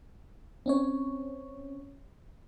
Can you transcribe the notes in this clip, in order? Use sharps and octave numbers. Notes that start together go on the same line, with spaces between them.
C4 C#4 C#5